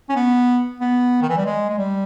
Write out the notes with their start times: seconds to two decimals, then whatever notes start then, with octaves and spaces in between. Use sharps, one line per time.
0.09 C#4
0.16 B3
0.80 B3
1.22 D#3
1.29 E3
1.37 G3
1.45 G#3
1.69 G#3
1.78 G3